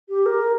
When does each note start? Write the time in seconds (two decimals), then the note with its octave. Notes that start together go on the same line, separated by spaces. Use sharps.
0.08 G4
0.25 A#4